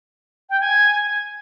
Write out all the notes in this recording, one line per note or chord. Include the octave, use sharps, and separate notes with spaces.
G5
G#5